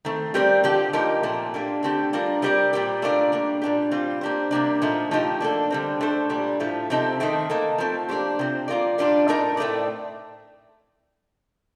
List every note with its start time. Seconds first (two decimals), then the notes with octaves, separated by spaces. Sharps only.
0.05 D#3 A3 C4
0.34 G3 C4 G4 A#4 D5
0.64 D3 F3 C4 G4 D5
0.93 F3 A#3 D#4 G4 A#4
1.23 A#2 A3 C4
1.54 A#3 D4 G4
1.83 D3 A3 C4 G4
2.13 G3 D4 F4 A#4
2.42 G3 C4 G4 A#4 D5
2.73 A#2 G3 C4 G4
3.02 A3 D4 F4 A#4 D5
3.32 G3 A#3 D4
3.62 A#2 G3 D4 G4
3.91 G3 C4 F4
4.21 A#3 D4 G4 C5
4.51 C3 G3 A#3 D4
4.82 A#2 F3 A3 D#4
5.11 F3 A3 D#4 G4
5.40 A#3 D4 A4
5.70 D3 G3 C4
6.01 A3 D4 A4 C5
6.30 A#2 G3 D4
6.60 A2 F3 A3
6.90 C3 F3 C4 D#4 A4
7.20 D#3 A3 C4
7.50 A#3 D#4 A4
7.78 F3 A3 C4
8.08 A#3 D4 G4 C5
8.39 C3 F3 C4
8.68 A#3 F4 A#4 D5
8.98 A#2 G3 D4 F4
9.28 A2 A3 D#4 A#4 D5
9.57 A2 A3 C4 G4 D5